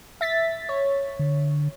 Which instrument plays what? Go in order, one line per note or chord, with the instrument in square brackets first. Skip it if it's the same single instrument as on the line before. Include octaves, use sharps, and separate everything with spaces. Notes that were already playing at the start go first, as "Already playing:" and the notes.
[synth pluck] E5 A6 B6
C#5
[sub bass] D3